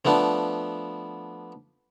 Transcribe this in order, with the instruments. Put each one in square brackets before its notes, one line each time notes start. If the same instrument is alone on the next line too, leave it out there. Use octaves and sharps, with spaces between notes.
[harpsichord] F3 A3 B3 D4